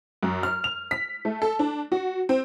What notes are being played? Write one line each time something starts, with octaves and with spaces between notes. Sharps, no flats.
F#2
F6
F7
B6
A3
A4
D4
F#4
C4